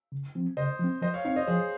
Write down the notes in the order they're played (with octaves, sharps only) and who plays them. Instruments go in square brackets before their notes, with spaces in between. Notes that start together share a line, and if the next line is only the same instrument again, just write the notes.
[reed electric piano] C#3
F3 C4
[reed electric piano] C#3 [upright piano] C5 D#5
[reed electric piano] F3 C4
[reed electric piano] F3 [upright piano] C5 D#5
[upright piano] C#5 F5
[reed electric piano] C4 D#4 [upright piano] C#5 F5
[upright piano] C5 D#5
[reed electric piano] F3 [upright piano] G#4 C5